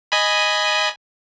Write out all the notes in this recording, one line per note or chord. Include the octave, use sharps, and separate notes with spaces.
D#5 G#5 B5